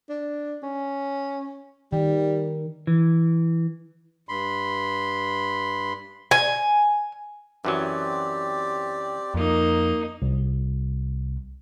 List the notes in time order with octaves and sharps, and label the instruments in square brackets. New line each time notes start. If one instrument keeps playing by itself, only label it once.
[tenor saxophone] D4
C#4
[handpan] D#3 [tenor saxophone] G3
[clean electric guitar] E3
[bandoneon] G2 B5 C6
[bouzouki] G#5
[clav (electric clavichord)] F#2 E3 F#3 [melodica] C4 G4 D5
[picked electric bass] F2 [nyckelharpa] A#3 D#4
[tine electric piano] C2